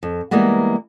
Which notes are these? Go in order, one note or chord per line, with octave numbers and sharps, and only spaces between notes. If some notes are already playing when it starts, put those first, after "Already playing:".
F2
E3 G3 G#3 A#3 B3